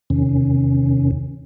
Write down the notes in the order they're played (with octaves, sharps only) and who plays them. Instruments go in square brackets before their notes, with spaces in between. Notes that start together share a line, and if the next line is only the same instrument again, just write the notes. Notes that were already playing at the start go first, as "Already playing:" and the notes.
[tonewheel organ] E2 C3 D#3 C#4